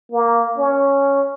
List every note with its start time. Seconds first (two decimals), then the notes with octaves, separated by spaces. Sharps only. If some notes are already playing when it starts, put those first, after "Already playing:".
0.12 A#3
0.58 C#4